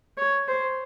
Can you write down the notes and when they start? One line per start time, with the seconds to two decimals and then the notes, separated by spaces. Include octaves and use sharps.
0.17 C#5
0.48 C5